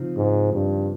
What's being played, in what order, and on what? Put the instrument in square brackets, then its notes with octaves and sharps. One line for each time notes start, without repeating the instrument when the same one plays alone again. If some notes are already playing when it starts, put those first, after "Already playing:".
Already playing: [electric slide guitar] C#3 F3 C4 D#4
[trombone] G#2
G2